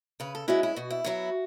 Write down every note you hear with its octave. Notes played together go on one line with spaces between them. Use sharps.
C#3 B4
A4
G#3 C#4 E4 F#4
E4
B2 F#4
E4
F#3 B3 E4 F#4